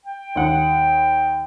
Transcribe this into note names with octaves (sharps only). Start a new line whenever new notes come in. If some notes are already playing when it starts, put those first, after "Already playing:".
G5
D#2 F#5